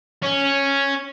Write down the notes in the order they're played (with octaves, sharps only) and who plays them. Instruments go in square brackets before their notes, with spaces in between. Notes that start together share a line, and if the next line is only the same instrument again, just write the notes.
[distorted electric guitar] C#4